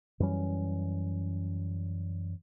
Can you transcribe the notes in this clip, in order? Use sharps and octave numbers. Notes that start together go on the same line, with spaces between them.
F#2 E3 G3 C#4